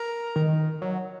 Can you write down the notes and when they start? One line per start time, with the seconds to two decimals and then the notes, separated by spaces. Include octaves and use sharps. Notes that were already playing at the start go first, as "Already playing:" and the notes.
Already playing: A#4
0.36 D#3
0.82 F#3